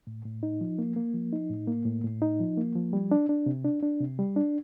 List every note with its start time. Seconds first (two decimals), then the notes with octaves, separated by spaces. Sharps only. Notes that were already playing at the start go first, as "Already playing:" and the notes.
0.07 A2
0.25 A2
0.43 D#4
0.61 F3
0.79 A#3
0.96 A#3
1.14 F3
1.33 D#4
1.50 A2
1.67 A#3
1.85 A2
2.04 A2
2.22 D#4
2.40 F3
2.57 A#3
2.75 F3
2.93 G3
3.11 D4
3.29 D4
3.46 C3
3.65 D4
3.83 D4
4.00 C3
4.19 G3
4.36 D4